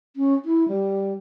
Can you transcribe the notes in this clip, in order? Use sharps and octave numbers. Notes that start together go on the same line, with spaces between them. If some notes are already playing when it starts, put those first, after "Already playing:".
C#4
E4
G3